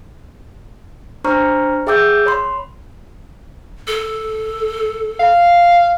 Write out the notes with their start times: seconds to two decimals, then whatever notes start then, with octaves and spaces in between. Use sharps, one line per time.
1.24 D4 C5 A#5 C#6 F6
1.87 G#4 E5 G5 D6 E6 G6
2.26 C#5 B5 C6
3.87 A4
5.20 F5